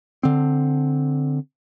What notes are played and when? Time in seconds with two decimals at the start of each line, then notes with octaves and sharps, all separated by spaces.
0.23 D3 C4